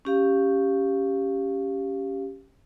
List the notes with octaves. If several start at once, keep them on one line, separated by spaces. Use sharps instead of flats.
C#4 G4 F5